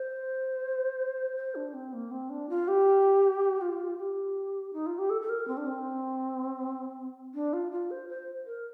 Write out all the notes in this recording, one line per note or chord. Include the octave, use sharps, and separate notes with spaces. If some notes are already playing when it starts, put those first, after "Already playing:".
Already playing: C5
C5
D4
C4
A#3
C4
D4
F4
G4
F4
G4
D#4
F4
G4
A4
A4
A#4
C4
D4
C4
D4
F4
F4
C5
C5
A#4